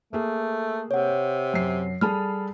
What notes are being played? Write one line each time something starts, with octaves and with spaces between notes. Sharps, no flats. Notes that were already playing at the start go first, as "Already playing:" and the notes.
A3 A#3 G#4
C3 C#5 F#5
F#2 C7
G3 G#4 A4 A5 B5 F6